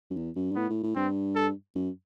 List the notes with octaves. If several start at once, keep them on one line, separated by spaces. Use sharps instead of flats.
F#2
E2
F#2
G2
A2 B3
A2
A2
G2 C4
A4
F#2